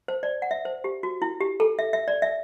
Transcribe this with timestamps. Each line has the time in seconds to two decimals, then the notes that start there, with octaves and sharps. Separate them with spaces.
0.08 C5
0.23 D5
0.42 F#5
0.51 E5
0.65 C5
0.84 G4
1.03 F#4
1.22 E4
1.41 G4
1.60 A4
1.79 E5
1.93 E5
2.08 D5
2.22 E5